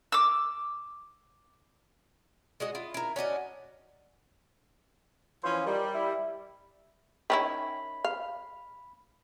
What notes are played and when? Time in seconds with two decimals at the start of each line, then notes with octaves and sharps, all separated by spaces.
0.12 D6 E6
2.60 G#3 F#4 D#5
2.75 E4 F4
2.94 E4 A#4
3.16 C#4 D4 F#4 D#5
5.44 E3 F3 C#4 C5
5.66 D#3 G3
5.94 E4
7.30 D#3 C#4 E4 B5
8.05 F5